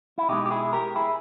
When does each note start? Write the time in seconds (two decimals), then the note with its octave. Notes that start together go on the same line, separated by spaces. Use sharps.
0.18 E4
0.29 B2 G#3 D#4 G4
0.46 G4
0.51 E4 G#4
0.73 G4 A#4
0.96 E4 G#4